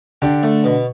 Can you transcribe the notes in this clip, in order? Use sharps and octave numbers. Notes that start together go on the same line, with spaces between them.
D3 D4 G4
A3
B2